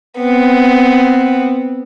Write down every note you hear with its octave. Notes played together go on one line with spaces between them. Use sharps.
B3 C4